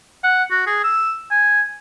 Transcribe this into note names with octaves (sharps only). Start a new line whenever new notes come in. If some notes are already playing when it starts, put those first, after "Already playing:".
F#5
F#4
G#4
E6
G#5